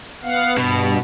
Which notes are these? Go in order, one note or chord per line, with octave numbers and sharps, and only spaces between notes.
B3 F5 F#5
G2 B2